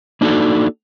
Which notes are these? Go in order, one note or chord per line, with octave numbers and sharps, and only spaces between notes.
A#3 D4 D#4 F#4 G#4 A4